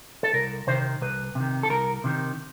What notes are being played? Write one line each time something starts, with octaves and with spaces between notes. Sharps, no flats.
A4
C2 A#4
C3 D#3 C5
C2 B4
C3 D#3
A4
C2 A#4
C3 D#3